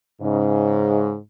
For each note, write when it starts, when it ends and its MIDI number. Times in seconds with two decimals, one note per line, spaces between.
0.22 1.16 44
0.22 1.16 49